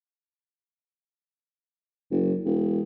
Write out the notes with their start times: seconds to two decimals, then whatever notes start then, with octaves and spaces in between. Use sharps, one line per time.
2.11 F#1
2.45 E1